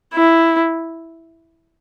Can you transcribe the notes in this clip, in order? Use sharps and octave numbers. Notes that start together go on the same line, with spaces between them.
E4